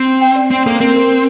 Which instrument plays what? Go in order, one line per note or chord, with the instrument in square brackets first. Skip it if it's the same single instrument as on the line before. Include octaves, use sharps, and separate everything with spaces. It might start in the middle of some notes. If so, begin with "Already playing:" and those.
Already playing: [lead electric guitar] C4
[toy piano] G5
D5
[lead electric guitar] C4
[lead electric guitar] A#3 [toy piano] A4
[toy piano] C5
[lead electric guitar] C4 [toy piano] A#4
[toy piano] A#4